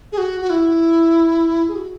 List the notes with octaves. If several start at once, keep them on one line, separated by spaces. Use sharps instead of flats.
G#4
F#4
F#4
E4
G#4
F#4